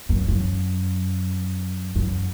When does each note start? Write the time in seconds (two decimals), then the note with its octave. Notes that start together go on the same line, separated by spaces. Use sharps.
0.09 F#2
0.28 F#2
1.96 F#2